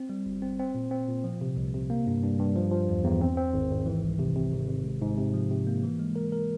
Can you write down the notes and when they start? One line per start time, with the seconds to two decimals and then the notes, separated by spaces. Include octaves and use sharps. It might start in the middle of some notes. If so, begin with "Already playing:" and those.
Already playing: C4
0.10 G3
0.26 G1
0.42 C4
0.59 C4
0.75 A#2
0.91 C4
1.08 A#2
1.24 F3
1.41 C3
1.57 C2
1.74 C3
1.90 A#3
2.07 G2
2.23 G2
2.40 G2
2.56 F3
2.71 F3
2.89 E2
3.04 E2
3.21 C4
3.37 C4
3.53 G#1
3.70 G#1
3.86 E3
4.04 C2
4.19 C3
4.36 C3
4.52 G#1
4.68 G#1
4.84 G#2
5.02 G#2
5.18 C3
5.34 F3
5.50 C3
5.67 A#3
5.83 E3
5.99 G#3
6.16 A#4
6.32 A#4